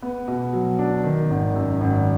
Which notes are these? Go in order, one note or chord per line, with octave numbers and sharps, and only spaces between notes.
B3
B2
F#3
D4
D#3
G#1
F#2
G#1